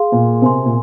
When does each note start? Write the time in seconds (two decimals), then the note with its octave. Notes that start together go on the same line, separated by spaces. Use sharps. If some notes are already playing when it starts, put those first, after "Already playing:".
Already playing: G#4 F5 C6
0.12 A#2
0.42 C3 A#4 G#5 C6
0.66 A#2